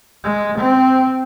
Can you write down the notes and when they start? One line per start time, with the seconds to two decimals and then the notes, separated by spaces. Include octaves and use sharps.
0.24 G#3
0.58 C4